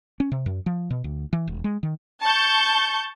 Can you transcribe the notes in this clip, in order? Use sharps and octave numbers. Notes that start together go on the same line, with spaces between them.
C#4
C3
F#2
F3
B2
D2
E3
E1
G#3
D#3
A5 C#6 G6